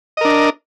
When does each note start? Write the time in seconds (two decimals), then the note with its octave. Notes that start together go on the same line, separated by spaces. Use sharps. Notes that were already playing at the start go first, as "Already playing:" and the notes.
0.17 D#5
0.21 A#4
0.25 D4